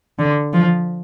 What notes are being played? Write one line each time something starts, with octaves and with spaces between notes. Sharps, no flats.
D3
F3